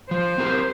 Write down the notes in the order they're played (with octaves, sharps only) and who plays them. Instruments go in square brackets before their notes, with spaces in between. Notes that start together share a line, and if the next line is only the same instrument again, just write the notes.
[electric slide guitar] F3 [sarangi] C5
[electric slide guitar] C4 G4 A#4